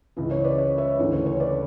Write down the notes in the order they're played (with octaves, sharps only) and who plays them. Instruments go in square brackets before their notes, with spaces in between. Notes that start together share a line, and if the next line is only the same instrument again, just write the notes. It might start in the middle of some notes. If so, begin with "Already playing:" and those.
[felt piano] C#2 C#3 E3
C#5
B4 D5
C#5
C#5 E5
D2 C#3 E3
C#5
C#5
B4 D5